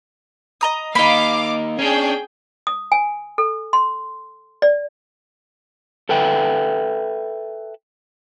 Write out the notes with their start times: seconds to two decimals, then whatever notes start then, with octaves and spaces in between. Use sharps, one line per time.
0.61 D#5 A#5 D#6
0.95 A#3 D#4 D#5 F5 B5 D6
1.79 C#4 D4 G#4 G5
2.67 D#6
2.92 G#5
3.38 A4
3.73 C6
4.62 D5
6.09 A4 B4 E5 G5